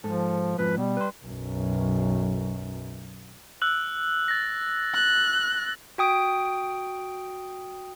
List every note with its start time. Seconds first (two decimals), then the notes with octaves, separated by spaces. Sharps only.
0.04 G#2 F3 A4
0.58 F2 G#2 F3 B4
0.77 B2 G3
0.97 B4 C6
1.24 B1 F#2
3.62 E6 F#6 F#7
4.28 A6 A#6
4.94 F#6
5.98 F#4 G5 D#6 D7